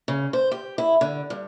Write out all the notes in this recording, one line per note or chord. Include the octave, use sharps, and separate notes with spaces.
C#3
C5
G4
E4
D3
G2